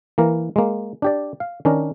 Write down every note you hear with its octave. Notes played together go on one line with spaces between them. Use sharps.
E3 A#3 A#4
G#3 A#3
D4 G4 D5
F5
D#3 C#4 D4 A#4